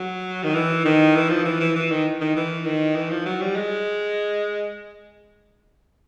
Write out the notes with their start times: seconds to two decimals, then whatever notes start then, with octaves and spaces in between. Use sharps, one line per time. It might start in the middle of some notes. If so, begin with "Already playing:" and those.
Already playing: F#3
0.44 D#3
0.54 E3
0.85 D#3
1.16 E3
1.30 F3
1.45 E3
1.60 E3
1.76 E3
1.91 D#3
2.21 D#3
2.36 E3
2.65 D#3
2.96 E3
3.11 F3
3.26 F#3
3.41 G3
3.56 G#3